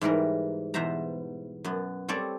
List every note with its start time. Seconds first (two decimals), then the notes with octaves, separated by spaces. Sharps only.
0.01 G#2 E3 G3 A#4
0.74 E2 B2 C5 E5 A#5
1.64 F#2 B3
2.08 G3 C4 A4 C#5 D5